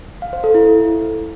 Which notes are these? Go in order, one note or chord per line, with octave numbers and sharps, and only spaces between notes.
F5
C5
A4
E4